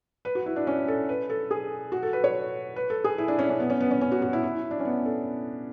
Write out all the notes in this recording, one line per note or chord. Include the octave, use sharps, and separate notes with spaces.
B4
F#4
E4
D4
C#4
A4
B4
A4
G#4
F#4
A4
B4
C#5
B4
A4
G#4
E4
D4
C#4
C#4
B3
C#4
B3
C#4
C#4
F#4
F#4
E4
E4
D4
C#4
B3
A4